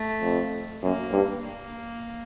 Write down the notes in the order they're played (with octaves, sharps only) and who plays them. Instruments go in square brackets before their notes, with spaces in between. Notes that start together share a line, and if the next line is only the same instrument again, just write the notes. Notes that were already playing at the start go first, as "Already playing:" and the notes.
Already playing: [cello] A3
[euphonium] F2
[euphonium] F#2 [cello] A#3
[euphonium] G2
[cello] A#3